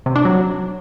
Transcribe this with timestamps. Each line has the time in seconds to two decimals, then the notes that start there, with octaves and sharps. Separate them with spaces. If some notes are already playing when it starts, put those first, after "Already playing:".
0.06 C3
0.16 D4
0.25 F#3